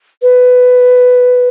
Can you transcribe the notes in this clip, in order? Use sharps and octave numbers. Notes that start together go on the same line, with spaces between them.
B4